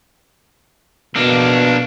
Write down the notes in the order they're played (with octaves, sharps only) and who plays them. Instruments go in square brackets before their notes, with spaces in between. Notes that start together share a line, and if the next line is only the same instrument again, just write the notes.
[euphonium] B2 [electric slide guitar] A#3 D4